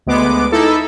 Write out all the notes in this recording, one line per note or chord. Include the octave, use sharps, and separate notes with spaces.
D2 G#3 B3 D6
D#4 E4 A4